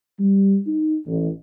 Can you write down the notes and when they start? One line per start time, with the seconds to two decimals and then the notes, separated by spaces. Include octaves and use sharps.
0.20 G3
0.67 D#4
1.07 A1